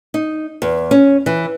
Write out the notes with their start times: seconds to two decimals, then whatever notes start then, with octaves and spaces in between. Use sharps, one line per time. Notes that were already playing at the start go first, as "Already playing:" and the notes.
0.14 D#4
0.62 E2
0.91 C#4
1.26 E3